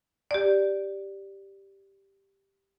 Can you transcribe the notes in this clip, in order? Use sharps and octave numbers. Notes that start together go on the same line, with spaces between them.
G4 D5